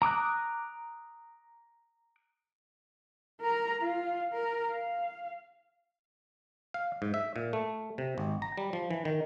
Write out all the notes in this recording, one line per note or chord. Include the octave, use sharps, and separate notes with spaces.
A#5 D6 D#6 F#6
A#4 A#5
F4 F5
A#4
F5
F5
G#2
E5
A#2
A3
C3
G#1
A#5
G3
F3
E3
D#3